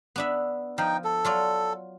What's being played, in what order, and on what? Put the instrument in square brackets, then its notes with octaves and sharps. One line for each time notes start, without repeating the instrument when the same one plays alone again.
[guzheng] B3 D4 E5
[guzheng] F3 [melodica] D#4 G5
[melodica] A4
[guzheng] F#3 F4 D5